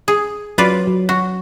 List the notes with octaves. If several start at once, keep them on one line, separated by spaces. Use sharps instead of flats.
G#4
F#3 F4 B4 D5
F#3
F#4